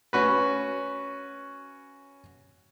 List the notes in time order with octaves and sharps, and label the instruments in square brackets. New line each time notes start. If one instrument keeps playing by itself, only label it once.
[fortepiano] C#4 F#4 B4